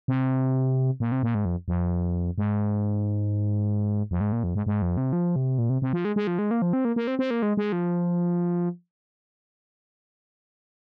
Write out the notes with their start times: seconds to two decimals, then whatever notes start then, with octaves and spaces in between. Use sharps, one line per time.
0.08 C3
1.00 A#2
1.12 C3
1.23 A#2
1.35 G#2
1.45 F2
1.68 F2
2.38 G#2
4.11 F2
4.21 G#2
4.32 A#2
4.44 F2
4.55 G#2
4.67 G#2
4.82 F2
4.97 C3
5.13 F3
5.36 C3
5.58 A#2
5.70 C3
5.82 C3
5.93 F3
6.05 G#3
6.16 G#3
6.27 F3
6.39 G#3
6.51 A#3
6.62 F3
6.73 C4
6.85 A#3
6.96 A#3
7.07 C4
7.19 C4
7.31 A#3
7.42 G#3
7.57 G#3
7.72 F3